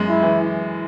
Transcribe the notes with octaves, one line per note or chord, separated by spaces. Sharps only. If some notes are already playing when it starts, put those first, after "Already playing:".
Already playing: F#2 G#3
E4
E3